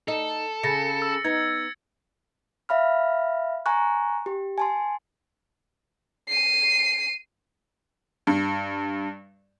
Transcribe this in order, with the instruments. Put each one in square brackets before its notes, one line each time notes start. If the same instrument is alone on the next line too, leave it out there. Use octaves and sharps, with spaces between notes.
[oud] D#4 [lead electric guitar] A4
[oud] C#3 [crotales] A6 A#6 C#7
[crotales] E6
[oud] B3 D#4 [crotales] G#6
[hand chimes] E5 F5 B5 F6
G#5 A#5 C#6 F#6
G4
G#5 A5 C6
[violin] C7 D#7
[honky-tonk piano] G2